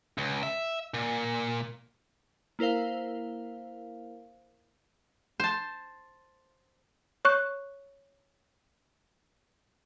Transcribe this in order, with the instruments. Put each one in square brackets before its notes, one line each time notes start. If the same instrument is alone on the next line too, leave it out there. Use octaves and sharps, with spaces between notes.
[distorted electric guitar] C#2
E5
A#2
[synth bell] A#3 E4 A#4 C5 F5
[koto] C5 A5
[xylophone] C#5 C#6 F#6